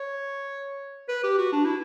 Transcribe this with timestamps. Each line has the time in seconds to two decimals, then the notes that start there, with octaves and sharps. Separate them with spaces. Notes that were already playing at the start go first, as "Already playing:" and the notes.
Already playing: C#5
1.08 B4
1.23 G4
1.38 F#4
1.52 D4
1.65 E4